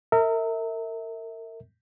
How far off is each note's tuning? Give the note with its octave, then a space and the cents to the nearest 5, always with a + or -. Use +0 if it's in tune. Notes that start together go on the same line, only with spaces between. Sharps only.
A#4 -35 E5 -30